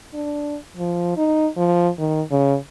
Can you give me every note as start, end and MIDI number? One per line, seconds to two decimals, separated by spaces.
0.14 0.57 62
0.77 1.12 53
1.17 1.47 63
1.57 1.89 53
1.98 2.22 51
2.31 2.56 49